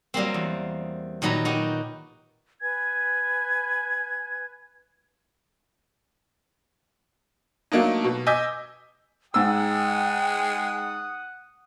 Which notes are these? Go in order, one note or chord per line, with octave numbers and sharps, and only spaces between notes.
F#3 G3 A#3 C4
E2
A#2 D#3 F#3 B4 A#5
D#4 F#4 G4
B4 G#5 G#6
F#3 A3 A#3 D4 D#4
B2
D#5 G#5 D6 E6 G6 B6
G#2 G#3 F#5 G5 D#6 E6